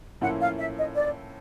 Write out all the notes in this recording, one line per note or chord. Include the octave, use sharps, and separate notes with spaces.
A2 F3 A#3 C#4 E4 F#5
F5
E5
D#5
D5